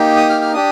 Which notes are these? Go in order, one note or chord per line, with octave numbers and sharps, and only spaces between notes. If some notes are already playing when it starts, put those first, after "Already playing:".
Already playing: A#3 D#4 G4
D#6
F6
F6
D4 G4 D#6